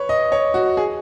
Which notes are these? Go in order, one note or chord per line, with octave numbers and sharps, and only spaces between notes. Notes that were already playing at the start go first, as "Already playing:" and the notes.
Already playing: B4 C#5
D#5
C#5
F#4
G#4